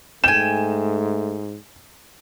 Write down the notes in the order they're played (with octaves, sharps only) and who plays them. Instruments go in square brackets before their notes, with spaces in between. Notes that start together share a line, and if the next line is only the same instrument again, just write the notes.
[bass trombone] G#2 [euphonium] A3 [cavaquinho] G5 G#5 [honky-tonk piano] E7